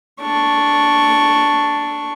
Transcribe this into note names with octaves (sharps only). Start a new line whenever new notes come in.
D4 C#6